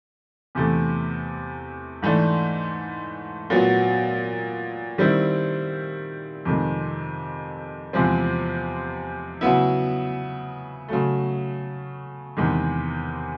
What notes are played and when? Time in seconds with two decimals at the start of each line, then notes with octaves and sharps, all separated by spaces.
0.55 E2 C3 E3 A3
2.02 G#2 E3 A3 D4
3.50 A#2 F#3 B3
4.98 D#3 G3 C4 E4
6.45 F2 C3 D#3 G#3
7.93 E2 C3 F3 G#3 C4
9.41 C#3 F#3 B3 E4
10.88 C#3 F#3 A3
12.37 E2 C3 D#3 G#3